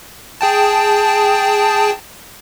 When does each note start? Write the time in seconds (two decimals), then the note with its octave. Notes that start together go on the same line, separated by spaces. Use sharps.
0.41 G#4 G5 A5